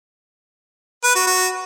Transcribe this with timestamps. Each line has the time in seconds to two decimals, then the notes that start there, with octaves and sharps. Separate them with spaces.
1.04 B4
1.15 F#4
1.27 F#4